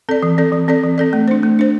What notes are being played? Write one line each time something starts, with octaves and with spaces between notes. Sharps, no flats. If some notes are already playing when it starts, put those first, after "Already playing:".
C4 A4 D5
E3
C4 A4 D5
E3
C4 A4 D5
E3
C4 A4 D5
A3
D4 C5
A3
D4 C5